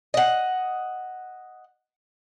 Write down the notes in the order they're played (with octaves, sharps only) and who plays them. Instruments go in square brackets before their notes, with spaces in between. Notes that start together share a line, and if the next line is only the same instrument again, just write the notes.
[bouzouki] D#5 F#5